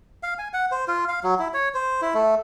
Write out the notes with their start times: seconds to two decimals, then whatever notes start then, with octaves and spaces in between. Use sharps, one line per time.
0.23 F5
0.38 G#5
0.53 F#5
0.71 C5
0.88 F4
1.08 F5
1.23 F#3
1.39 E4
1.54 C#5
1.74 C5
2.02 E4
2.14 A3